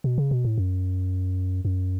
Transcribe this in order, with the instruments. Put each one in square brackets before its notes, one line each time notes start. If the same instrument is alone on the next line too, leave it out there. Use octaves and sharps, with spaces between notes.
[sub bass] B2
C#3
B2
A2
F#2
F#2